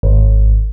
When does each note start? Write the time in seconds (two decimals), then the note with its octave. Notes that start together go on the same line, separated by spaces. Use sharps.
0.03 G#1